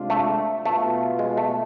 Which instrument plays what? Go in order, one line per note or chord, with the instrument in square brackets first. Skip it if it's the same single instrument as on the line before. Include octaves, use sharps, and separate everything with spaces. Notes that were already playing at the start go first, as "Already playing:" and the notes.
Already playing: [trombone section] C3 G#3 D4 F4
[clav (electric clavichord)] A3
[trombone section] B2 B3 F4 [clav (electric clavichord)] A3
[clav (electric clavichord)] G#3
A3